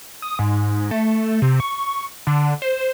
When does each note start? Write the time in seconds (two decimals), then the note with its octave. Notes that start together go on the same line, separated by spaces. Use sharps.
0.22 D#6
0.39 G#2
0.91 A3
1.42 C3
1.60 C#6
2.27 D3
2.62 C5